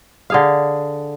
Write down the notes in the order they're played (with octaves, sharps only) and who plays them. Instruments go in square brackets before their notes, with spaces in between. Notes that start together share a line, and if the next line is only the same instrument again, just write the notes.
[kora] D3 G#4 F5